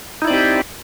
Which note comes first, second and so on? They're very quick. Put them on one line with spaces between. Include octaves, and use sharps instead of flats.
D#4 E4 D5 C4 G4